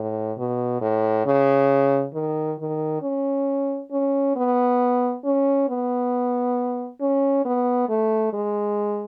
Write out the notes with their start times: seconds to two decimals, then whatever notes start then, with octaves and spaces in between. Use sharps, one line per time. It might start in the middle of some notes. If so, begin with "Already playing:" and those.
Already playing: A2
0.38 B2
0.81 A2
1.26 C#3
2.14 D#3
2.59 D#3
3.02 C#4
3.92 C#4
4.36 B3
5.25 C#4
5.69 B3
7.01 C#4
7.45 B3
7.89 A3
8.33 G#3